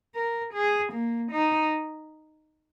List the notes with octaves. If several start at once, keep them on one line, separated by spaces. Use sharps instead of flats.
A#4
G#4
A#3
D#4